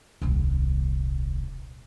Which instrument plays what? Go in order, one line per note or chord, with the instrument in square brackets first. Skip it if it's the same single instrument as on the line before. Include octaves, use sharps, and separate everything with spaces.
[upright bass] D#1 C2